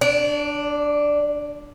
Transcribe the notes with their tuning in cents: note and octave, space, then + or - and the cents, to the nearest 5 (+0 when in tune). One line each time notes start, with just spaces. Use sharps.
D4 +0 D5 -40